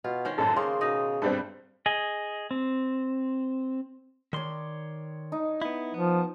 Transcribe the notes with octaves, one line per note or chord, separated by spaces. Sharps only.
B2 F4
D#3 C#4 C5
A1 F#2 A4
C#3 A#3 D#4 C6
B2 D#4 D#5
G2 G3 C4 A4
G#4 D#5
C4
D#3 C#5 D5 C6
D#4
B3 E4
F3 B3